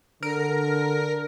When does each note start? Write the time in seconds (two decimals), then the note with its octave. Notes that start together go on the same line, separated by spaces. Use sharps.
0.23 D3 A#4